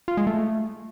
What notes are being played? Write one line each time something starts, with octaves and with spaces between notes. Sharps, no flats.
F4
G#3
A3